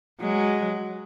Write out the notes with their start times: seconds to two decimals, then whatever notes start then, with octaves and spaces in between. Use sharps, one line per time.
0.20 F#3 G#3